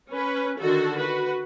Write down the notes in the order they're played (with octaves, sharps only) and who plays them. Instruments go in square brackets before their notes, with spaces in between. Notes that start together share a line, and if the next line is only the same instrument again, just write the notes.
[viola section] C#4 B4
D3 D#3 F#4 A4
F#4 B4